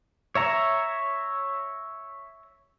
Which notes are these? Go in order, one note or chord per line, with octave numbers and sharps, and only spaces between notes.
C#5 E5 A#5